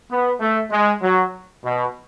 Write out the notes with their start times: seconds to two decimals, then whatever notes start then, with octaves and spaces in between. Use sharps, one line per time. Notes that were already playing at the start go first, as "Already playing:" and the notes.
0.10 B3
0.40 A3
0.71 G#3
1.02 F#3
1.64 B2